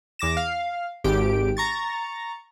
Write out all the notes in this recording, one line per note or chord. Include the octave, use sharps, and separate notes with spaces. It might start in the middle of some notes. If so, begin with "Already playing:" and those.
E2 D6 A#6 E7
F5
G#1 G4 D7
A#5 C#6 A6